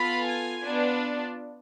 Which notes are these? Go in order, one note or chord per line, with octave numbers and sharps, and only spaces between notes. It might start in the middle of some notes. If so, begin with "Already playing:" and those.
Already playing: B3 F4 A4 B5
G#5
B3 D4 F4